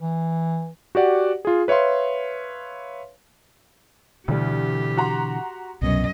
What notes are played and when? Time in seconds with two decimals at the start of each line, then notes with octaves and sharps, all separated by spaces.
0.02 E3
0.95 F#4 G4 D5 F#5
1.45 F4 G#4
1.68 B4 C#5 E5 F5 C6
4.28 D2 B2 D3 E3 G3 G4
4.97 F#4 A#5 C6
5.82 C2 F#2 B2 D#5